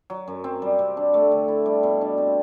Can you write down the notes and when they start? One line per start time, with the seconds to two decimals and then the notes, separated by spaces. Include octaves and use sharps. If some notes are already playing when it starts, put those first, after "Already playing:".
0.10 F#3
0.28 F#2
0.44 C4
0.62 G3
0.79 C3
0.97 D4
1.14 A3
1.32 D3
1.48 E4
1.66 G3
1.83 B2
2.01 D4
2.18 C4